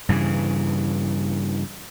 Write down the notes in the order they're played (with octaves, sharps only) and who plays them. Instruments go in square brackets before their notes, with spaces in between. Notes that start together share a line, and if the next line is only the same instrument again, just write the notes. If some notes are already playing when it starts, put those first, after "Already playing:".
[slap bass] G2 C#3 E3